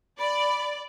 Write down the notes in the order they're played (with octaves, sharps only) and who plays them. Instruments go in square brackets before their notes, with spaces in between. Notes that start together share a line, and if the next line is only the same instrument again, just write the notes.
[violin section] D5 [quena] B5